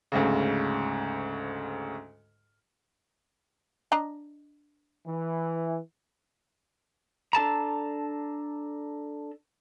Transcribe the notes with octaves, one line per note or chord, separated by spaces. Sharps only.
D2 G#2 C#3
D4 D#5 A#5
E3
D4 A4 A5 A#5